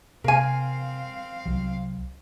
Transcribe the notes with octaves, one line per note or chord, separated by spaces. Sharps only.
C3 C4 A#4 F5 G#5
C2 F#3